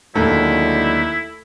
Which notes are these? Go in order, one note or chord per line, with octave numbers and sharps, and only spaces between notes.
D#2 D3 F#3 G#3 A3 E4